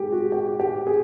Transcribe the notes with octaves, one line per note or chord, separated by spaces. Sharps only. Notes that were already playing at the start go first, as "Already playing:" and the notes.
Already playing: G#2 G#3 G4 G#4
F#4
G4
G4
G#4